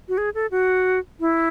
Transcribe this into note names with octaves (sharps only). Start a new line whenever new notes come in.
F#4
G#4
A4
F#4
E4